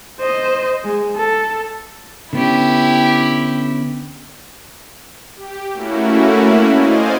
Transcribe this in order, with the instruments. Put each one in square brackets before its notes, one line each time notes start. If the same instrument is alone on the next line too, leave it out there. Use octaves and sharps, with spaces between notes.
[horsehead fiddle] C5 D#5
G#3
A4
[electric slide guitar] D3 B3 C#4 [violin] E4 G4
[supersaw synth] G4
A3 A#3 C#4 E4 F#4
C5 D5 D#5 F5 G#5